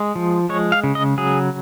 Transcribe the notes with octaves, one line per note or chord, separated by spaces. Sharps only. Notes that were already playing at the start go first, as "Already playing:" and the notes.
Already playing: G#3
F3
G#3 C#5
F5
C#3
D#5
F#3 G#4